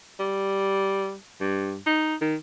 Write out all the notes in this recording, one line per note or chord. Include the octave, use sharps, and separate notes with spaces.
G3
G2
D#4
D#3